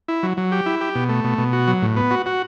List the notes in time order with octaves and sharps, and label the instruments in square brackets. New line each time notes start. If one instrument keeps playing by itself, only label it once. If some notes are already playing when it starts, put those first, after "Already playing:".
[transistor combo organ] E4
F#3
F#3
G4
E4
G4
B2
A3
B2
B2
F#4
F#3
A2
B3
F#4
F#4